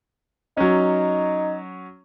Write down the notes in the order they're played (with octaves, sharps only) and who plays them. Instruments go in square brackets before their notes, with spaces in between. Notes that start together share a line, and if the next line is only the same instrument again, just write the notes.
[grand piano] F#3 C#4 [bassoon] D#4